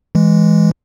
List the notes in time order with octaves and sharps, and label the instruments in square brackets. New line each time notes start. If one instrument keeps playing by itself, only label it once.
[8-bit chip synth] E3 G#3